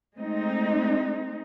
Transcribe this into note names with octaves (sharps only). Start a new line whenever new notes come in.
G#3 A3 C4 D#4